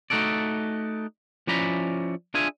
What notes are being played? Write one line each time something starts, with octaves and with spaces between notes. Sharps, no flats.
A3 D#4 F#4 A4 D5
F3 C#4 E4 D5 A#5 B5
D4 F4 G#4 E5 G#5